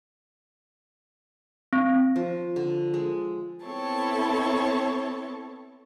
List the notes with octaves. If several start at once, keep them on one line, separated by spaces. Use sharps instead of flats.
C4
F3
D3
G#3
B3 C4 E4 A4 C#5 A5